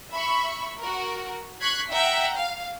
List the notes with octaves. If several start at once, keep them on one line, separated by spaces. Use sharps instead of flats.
E5 B5 C#6
F#4 A#4
C#6 F#6 G#6 B6 C7
E5 F#5 G5 A#5
F5